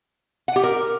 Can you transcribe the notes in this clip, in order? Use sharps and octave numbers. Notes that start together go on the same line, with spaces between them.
F#5
G4
A#4